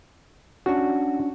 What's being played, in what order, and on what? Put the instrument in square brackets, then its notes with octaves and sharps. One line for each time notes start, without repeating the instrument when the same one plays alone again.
[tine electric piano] C#4 D4 [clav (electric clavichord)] F#4